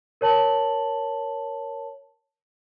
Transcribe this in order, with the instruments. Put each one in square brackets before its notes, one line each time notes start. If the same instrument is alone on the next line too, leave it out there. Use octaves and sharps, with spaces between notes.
[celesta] A#4 C#5 A5 F#7